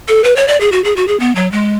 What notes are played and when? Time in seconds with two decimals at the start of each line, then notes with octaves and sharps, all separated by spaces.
0.08 A4
0.24 B4
0.36 C#5
0.48 D5
0.61 G#4
0.72 F#4
0.84 G#4
0.96 F#4
1.08 G#4
1.20 B3
1.36 F#3
1.52 G#3